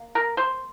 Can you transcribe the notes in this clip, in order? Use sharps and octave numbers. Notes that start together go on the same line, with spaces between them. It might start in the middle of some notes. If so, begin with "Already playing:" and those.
Already playing: A#3
A#4
C5